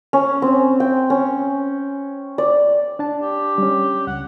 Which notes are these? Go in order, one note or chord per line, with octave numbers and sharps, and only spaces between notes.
C#4
C4
G5
C#4
D5
D4 A5
G4
G3 C#4
C#2 F#5